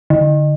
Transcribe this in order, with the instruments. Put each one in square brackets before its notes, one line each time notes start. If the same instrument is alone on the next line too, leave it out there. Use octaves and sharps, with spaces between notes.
[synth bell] D3